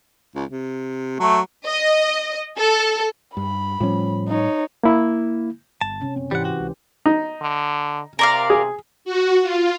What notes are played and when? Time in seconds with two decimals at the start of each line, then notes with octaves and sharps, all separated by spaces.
0.35 C#2
0.50 C3
1.20 F#3 A3
1.66 D#5
2.58 A4
3.37 G2 B5
3.80 A2 F3 G3 C#4
4.28 D#4 C#5
4.84 A#3 E4
5.81 G1 A5
6.01 C3 C#4
6.16 F#1 C4
6.31 G#2 E3 G3 G4 C5 F#5
6.45 F#4
6.59 C#2
7.06 D#4
7.41 D3
8.19 C3 A#4 D5 F5
8.50 G#4
9.05 F#4
9.43 F4